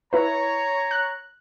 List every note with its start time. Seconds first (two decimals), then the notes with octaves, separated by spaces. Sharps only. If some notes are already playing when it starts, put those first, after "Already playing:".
0.13 E4 B4 C#5 A#5
0.91 F#6